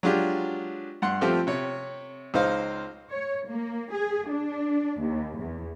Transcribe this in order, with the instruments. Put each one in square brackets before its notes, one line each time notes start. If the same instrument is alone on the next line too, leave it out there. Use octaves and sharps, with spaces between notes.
[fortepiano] F#3 G#3 D4 F4 G4
G2 F#5 C6
F3 A3 C4 F4 G4
C3 C#5
C#2 D#4 C5 F5
[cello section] C#5
A#3
G#4
D4
D#2
E2